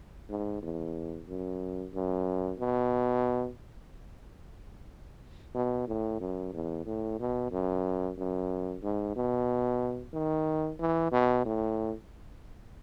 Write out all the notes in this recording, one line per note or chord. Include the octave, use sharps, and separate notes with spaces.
G#2
E2
F#2
F#2
B2
B2
A2
F#2
E2
A2
B2
F#2
F#2
G#2
B2
D#3
E3
B2
A2